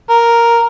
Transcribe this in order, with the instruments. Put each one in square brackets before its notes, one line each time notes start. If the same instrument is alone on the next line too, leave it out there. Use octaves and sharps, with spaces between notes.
[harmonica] A#4